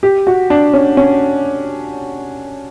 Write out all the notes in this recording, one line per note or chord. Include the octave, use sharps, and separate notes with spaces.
G4
F#4
D4
C#4
C#4